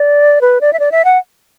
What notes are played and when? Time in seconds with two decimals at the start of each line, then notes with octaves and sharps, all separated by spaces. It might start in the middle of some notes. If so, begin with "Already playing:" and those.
Already playing: D5
0.41 B4
0.61 D5
0.73 E5
0.80 D5
0.92 E5
1.05 F#5